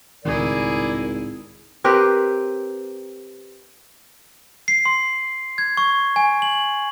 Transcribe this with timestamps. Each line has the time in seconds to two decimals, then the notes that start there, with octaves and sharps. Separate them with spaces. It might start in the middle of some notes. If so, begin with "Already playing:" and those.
0.25 G#1 C#2 A2 D#3 E4 G#4 A#4 D5
1.84 C4 G4 A#4 B4
4.68 C7
4.85 C6
5.58 G#6
5.77 C#6
6.16 G#5
6.42 F#7